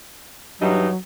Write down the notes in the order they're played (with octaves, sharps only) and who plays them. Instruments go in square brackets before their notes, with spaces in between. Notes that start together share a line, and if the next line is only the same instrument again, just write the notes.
[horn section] G2 E3 D#4 [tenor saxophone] F#3